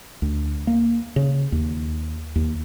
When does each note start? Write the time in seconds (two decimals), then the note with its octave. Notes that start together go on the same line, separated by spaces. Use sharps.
0.22 D2
0.67 A#3
1.16 C#3
1.52 D#2
2.36 D#2